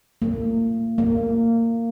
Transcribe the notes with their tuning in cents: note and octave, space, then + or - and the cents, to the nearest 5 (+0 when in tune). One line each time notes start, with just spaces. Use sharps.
A#3 -35
A#3 -20